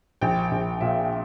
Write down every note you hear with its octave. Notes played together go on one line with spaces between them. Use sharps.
A#1 G5
A#1
A#2 E5